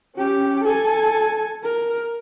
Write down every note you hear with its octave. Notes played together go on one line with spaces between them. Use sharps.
C#4 G4
A4 G#5
A#4